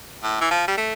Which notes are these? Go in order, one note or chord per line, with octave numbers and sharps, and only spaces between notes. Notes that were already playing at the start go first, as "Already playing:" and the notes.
A2
E3
F3
G3
A3